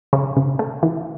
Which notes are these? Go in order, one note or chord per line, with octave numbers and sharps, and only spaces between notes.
C#3
C#3
A3
E3